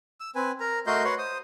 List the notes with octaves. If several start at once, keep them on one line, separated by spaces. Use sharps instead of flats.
E6
C4 B4 G#5
A#4 A#5
A3 F#4 A#4 D#5 C6 G6
F#4 B4 C#5 F#5 C6
C5 D#6